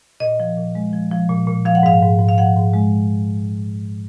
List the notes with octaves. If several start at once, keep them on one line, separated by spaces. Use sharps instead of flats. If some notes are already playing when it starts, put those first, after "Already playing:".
A#2 D#5
F3
A#2
G#3
F3
F3
A#2
A#2
F3 F5
F#5
G#2 F5
G#2
G#2
F5
F3 F#5
G#2
G#3